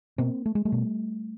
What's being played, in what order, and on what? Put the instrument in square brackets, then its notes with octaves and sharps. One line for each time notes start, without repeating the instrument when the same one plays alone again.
[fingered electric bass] B2 A#3 C4
A3
G#3
G3 A3
B2